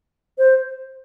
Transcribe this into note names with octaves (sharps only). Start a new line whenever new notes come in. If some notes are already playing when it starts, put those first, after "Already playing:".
C5